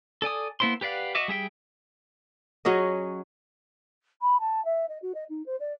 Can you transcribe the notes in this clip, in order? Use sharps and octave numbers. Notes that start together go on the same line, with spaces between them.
A4 D5 G#5 D#6
A#3 B3 E4 C5 C6
G4 B4 D5 F5 F#5
F#4 D#5 E5 D6
G3 G#4 E5 G5
F#3 C#4 G#4 D#5
B5
A5
E5
D#5
F#4
D#5
D#4
C5
D5